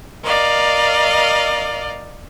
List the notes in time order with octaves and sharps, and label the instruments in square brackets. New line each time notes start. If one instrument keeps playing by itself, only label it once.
[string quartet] A#4 D5 D#5 F5